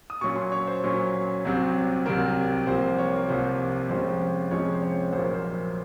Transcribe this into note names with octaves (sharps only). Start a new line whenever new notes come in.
D#6
A#2 F#3 C#4 C#6
C6
C#5
C5
A#2 F#3 C#4
C2 C3 F#3 C4
C2 C3 F#3 C4 A#4
C2 C3 F3 A#3 C5
C#5
A#4
C2 C3 F3 A#3 C5
F2 C3 F3 G#3 C#4 C5
F2 C3 F3 G#3 C#4 C#5
C5
C#5
A#1 A#2 F#3 A#3 C5
A#4
C5